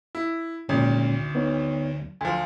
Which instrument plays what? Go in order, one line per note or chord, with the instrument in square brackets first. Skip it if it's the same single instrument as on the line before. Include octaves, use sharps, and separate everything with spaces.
[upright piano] E4
[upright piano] G#1 [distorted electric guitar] D2 [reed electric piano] A#2 G#3 C#4
[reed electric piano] B3 D#4 C#5
[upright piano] D2 F3 [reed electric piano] G#5